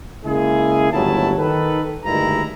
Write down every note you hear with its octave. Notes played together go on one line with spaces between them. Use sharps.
C#3 G#3 A#3 E4 G#4
G1 D#2 A2 F#3 E4 A5
D#3 A4 B4
D2 G2 D#3 G#3 E4 A#5